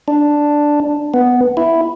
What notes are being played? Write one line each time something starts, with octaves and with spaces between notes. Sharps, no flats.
D4
B3
E4